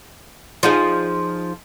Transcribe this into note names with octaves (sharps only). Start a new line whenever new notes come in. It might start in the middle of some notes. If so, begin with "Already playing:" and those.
F3 D#4 G#4